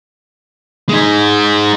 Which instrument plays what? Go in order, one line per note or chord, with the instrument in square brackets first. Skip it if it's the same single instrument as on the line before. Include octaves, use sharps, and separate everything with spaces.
[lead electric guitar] G#3 D#4